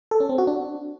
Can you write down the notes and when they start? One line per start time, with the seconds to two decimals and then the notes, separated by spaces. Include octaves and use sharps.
0.11 A4
0.20 C#4
0.29 C4
0.38 F#4
0.47 D4